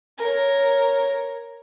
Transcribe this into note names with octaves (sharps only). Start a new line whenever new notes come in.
A#4 C#5